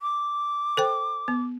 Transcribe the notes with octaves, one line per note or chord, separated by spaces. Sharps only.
D6
A4 C5 G5
B3